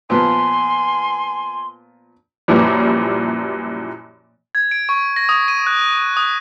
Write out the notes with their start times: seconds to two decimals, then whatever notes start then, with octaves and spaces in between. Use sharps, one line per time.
0.10 A#2 F3 B3 G#5 C6
2.48 F#2 A#2 E3 F3 G3
4.55 G#6
4.71 D7
4.89 C#6
5.16 A#6
5.29 D#6
5.48 D#7
5.67 F#6
6.17 D#6